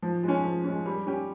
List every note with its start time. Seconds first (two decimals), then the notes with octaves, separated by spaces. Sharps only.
0.02 F3
0.23 G#3 C#4
0.44 F3
0.64 G#3 C#4
0.86 G3
1.06 C#4 G4